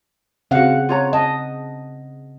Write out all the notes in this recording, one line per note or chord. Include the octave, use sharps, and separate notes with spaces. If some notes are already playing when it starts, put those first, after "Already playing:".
C#3 C4 F#4 F5 F#5
F4 C#5 A#5
D#5 A5